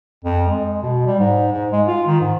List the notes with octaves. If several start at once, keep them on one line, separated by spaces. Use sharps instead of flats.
F2
G#3
B2
G3
G#2
G#2
G#3
F4
D#3
G#2